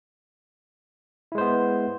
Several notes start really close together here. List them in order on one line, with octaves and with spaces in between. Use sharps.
E4 G#3 C5 B3